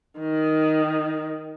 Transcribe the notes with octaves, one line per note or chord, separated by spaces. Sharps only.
D#3